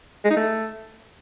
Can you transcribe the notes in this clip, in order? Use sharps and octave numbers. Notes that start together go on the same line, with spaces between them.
G#3
D#4
A3